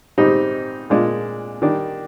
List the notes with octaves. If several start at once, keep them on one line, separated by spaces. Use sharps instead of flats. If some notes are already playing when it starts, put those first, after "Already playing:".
G#2 G3 C4 D#4 G4
A#2 G#3 D4 F4
D#3 G3 D4